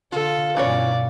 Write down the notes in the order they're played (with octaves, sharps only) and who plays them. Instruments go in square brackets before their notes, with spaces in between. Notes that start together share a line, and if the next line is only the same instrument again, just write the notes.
[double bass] D3 [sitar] F4 [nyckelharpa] A4
[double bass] G2 B2 [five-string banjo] E3 C#4 C#5 [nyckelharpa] D5